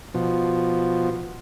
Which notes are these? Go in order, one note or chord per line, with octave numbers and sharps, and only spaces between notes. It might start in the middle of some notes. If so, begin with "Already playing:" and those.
B2 F3